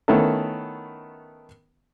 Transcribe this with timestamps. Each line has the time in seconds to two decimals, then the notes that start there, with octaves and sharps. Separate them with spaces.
0.08 D#3 A3 B3 C#4 E4 A4